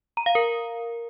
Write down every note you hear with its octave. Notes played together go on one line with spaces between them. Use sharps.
A#5
F5
A#4